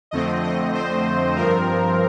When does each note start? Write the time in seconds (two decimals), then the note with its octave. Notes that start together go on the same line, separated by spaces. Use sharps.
0.11 F2 D3 A3 C4 D#5
0.43 D#5
0.74 C5
1.35 G2 F3 C4 A#4